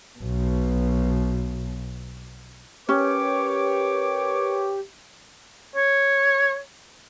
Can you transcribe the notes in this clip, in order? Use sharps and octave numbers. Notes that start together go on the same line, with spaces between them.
B1 B2
C#4 G4 A#4 B4 C#5 D6
C#5